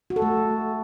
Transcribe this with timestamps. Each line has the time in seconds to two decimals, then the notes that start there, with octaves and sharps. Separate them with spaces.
0.10 F#4
0.16 A4
0.22 A3